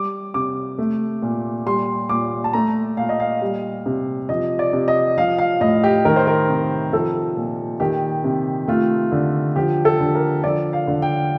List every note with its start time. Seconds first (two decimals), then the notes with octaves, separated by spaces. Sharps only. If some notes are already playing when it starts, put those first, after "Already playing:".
Already playing: G3 D6
0.34 C3 D6
0.78 A3
1.22 A#2
1.66 G3 C6
2.09 A#2 D6
2.44 A5
2.53 A3 A#5
2.97 A#2 F5
3.09 D#5
3.20 F5
3.42 G3
3.86 C3
4.29 F3 D#5
4.59 D5
4.73 C3
4.88 D#5
5.17 F3 F5
5.38 F5
5.60 A2 D#5
5.84 G4
6.05 D#3 A#4
6.16 C5
6.27 A#4
6.49 C3
6.92 F3 A4
7.37 A#2
7.80 D#3 G4
8.24 C3
8.68 A3 F4
9.12 D3
9.56 F3 G4
9.85 A4
10.00 D3
10.15 A#4
10.44 F3 D5
10.73 F5
10.87 D3
11.02 G5